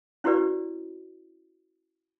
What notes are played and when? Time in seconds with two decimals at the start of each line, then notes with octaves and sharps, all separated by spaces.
0.24 C#4 E4 F#4 G4 B4 D5